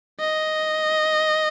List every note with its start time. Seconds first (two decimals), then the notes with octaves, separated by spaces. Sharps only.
0.20 D#5